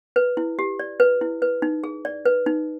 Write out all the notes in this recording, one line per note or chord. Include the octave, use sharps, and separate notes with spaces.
B4
E4
G4
D5
B4
E4
B4
D#4
G#4
D5
B4
D#4